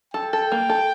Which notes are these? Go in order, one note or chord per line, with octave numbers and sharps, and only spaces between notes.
A4 G5
A4
A#3
A4